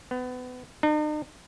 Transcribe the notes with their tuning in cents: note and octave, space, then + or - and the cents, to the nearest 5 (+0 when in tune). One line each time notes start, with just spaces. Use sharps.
B3 +30
D#4 -45